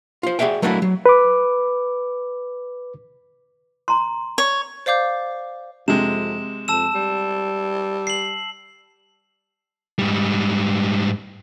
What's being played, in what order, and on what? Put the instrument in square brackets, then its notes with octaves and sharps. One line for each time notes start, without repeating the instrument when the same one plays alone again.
[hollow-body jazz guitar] F4 C5
F#4 G#4 D5 E5 G5
F#3 A3 A#3 D4 E4 F#4
F#3
[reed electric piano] B4 D6
[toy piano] A#5 C6
[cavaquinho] C#5
[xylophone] C5 D5 F5 D6 G6
[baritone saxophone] F2 [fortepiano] C3 G#3 [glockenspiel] E7
[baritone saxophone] F2 [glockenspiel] A5 E6 E7
[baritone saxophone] G3
[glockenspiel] C7 F#7
[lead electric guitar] G#2 G3